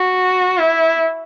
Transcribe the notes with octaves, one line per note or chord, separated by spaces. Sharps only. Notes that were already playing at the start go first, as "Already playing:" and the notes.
Already playing: F#4
E4